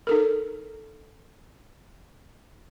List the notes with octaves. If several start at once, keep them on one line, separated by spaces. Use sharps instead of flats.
D#4 A4 A#4